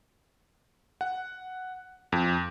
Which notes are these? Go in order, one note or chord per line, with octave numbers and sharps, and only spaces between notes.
F#5
F2